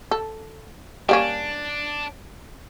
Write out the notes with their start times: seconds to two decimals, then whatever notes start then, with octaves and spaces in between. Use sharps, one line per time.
0.11 A4
1.09 G3 A#3 C#4 D4